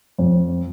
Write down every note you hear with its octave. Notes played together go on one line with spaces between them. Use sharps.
F2